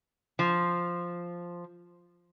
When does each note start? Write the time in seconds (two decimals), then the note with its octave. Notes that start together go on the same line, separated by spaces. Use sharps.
0.39 F3